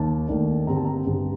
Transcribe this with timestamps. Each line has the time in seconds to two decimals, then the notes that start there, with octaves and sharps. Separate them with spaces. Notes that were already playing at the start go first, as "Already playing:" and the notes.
Already playing: D#2 D#3 A5
0.28 D#2 D#3 A3 D4
0.67 G2 D3 G3 C4 A#5
0.76 A5
0.85 A#5
1.06 G2 D3 G3 C4